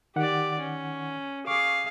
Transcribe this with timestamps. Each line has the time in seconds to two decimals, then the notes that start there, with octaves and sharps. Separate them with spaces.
0.16 D#3 G4 D5 F#5
0.59 C#4
1.47 G#4 F5 C#6 D6